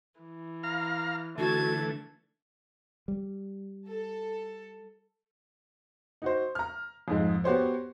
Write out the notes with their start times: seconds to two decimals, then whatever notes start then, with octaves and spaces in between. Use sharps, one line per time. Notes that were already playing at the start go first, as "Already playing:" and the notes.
0.19 E3
0.63 F5 A#5 F6
1.38 D3 E3 A3 F#4 A5 G#6
3.08 G3
3.88 A4
6.22 D#4 F#4 C5
6.55 A#5 F6
7.08 F2 G#2 G#3
7.44 B3 F#4 G4 C5 C#5